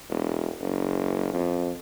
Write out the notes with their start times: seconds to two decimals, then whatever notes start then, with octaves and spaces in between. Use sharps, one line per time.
0.10 E1
0.60 F#1
1.33 F2